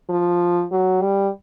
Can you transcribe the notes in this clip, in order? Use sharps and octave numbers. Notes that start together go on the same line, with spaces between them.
F3
F#3
G3